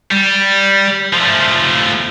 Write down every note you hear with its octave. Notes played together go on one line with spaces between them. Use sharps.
G3
F3 A3